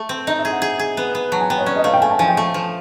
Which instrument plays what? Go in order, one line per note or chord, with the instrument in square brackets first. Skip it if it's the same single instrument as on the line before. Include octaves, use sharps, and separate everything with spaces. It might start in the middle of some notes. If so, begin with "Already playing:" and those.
Already playing: [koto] A3
C4
[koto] D#4 [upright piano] D#5
[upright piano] E5
[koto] G#4
[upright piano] F#5
[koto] G#4
G#4
B3
B3
[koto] F#3 [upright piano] A5
[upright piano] G#5
[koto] B3 [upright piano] G5
[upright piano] C#5
[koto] C#4 [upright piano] D5
[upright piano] D#5
[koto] A3 [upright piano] F5
[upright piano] G5
[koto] A3 [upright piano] G#5
[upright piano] A5
[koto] F3 [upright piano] G#5
[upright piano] G5
[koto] A3
F3